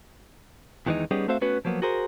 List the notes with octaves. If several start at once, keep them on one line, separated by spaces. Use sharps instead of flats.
E2 D#3 E3 G#3 D#4
G3 B3 C#4 D#4 G4 G#4
A3 C4 F#4 C5 E5 F5
A3 B3 C#4 F#4 B4
F3 F#3 A#3 B3
F#4 G#4 A#4 C5